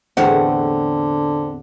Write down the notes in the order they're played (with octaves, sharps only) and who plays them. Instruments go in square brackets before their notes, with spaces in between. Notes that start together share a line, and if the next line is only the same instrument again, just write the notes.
[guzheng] E2 A2 [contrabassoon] D3 [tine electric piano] C4 [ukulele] F#5